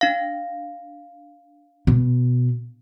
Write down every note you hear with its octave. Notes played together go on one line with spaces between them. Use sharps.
D4 F5
B2